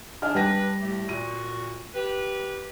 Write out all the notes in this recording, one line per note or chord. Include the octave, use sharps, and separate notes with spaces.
D4 D#5 G#5 F6
G3 D4 B4 G5 A#6
A2 A3 G4
A#2 F#4 D#7
G4 B4